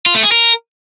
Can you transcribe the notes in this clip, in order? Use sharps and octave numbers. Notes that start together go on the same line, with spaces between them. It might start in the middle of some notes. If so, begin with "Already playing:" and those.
F4
A3
G#4
A#4